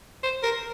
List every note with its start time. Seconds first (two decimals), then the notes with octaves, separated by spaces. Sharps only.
0.23 C5
0.43 A#4